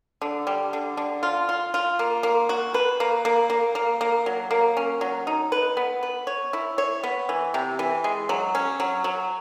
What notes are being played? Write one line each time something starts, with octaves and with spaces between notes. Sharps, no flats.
D3
G3
D3
D3
F4
F4
F4
A#3
A#3
F#4
B4
A#3
A#3
A#3
A#3
A#3
F#3
A#3
C#4
F#3
D#4
B4
B3
B4
C#5
E4
C#5
B3
E3
C3
E3
G#3
F#3
C#4
F#3
F#3